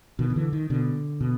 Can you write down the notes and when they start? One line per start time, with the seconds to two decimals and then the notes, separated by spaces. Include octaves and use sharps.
0.19 B2 D#3
0.30 D#3
0.36 D3 E3
0.53 D#3
0.70 B2 D3
1.21 B2